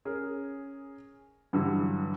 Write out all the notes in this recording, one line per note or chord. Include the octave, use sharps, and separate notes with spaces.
C#4 G#4 A#4
G2 D3 E3 F#3 G4